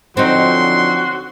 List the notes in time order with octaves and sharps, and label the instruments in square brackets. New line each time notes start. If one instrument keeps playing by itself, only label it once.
[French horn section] D3 F3 [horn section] F#3 C6 [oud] C4 D#4 [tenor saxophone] F#4